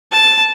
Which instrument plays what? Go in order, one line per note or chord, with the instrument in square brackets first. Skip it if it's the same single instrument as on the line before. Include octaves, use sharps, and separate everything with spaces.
[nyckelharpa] A5